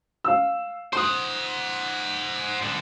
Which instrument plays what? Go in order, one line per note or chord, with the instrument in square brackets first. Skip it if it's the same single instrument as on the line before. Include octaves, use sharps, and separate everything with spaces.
[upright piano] F5 E6
[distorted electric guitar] C5 F#5 [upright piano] C6 D#6
[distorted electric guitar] C2 D3